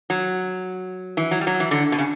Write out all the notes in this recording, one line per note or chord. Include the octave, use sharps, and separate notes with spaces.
F#3
E3
F#3
G3
F#3
E3
D3
B2
C#3